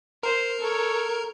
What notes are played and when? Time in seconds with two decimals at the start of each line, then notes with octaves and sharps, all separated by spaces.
0.23 A#4 C5 A#5
0.60 A4 C#5